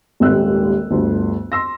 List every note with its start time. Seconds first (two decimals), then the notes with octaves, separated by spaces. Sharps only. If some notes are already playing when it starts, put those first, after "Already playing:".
0.20 D#1 G#1 D#2 E6 F#6
0.91 G1 D2
1.52 C6 E6 A#6